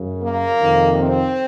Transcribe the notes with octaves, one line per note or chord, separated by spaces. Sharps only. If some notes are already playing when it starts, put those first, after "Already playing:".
Already playing: F#2 C#3
A#3
F2 C3 D#3
C4